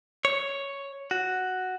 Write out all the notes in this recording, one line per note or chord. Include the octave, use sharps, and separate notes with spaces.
C#5
F#4